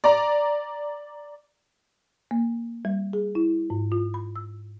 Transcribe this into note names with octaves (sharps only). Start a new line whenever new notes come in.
D5 A#5
A#3
G3
G#4
E4
G#2
F4
B5
E6